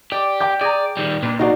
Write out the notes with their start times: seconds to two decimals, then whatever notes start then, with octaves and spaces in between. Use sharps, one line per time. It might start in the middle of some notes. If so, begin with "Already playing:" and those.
0.12 G4 D5
0.40 G5 D6 G6
0.61 G#4 D5 A#5
0.97 D#3 G3
1.23 A#2 D4 B4
1.39 F#3 D#4 F4 F#4 A#4 D5